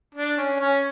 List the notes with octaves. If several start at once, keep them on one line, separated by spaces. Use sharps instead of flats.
D4
C#4
C#4